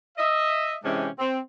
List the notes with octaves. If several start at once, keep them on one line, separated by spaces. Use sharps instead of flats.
D#5 E5
C3 E3 G#3 C#4 D4 G4
C4